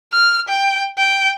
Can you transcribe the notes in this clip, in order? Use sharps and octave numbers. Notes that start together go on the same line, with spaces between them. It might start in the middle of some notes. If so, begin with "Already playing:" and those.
F6
G5
G5